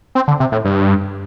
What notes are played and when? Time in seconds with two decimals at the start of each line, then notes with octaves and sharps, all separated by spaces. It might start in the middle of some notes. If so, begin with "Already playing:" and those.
0.15 C4
0.28 D3
0.40 C3
0.52 A2
0.65 G2